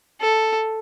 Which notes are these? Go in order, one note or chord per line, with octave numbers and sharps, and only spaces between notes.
A4